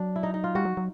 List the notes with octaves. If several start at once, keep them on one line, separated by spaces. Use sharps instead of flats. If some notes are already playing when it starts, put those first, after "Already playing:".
Already playing: F#3 D4
E4
D#4
D#4
F4
G3 F#4
F#3
F#3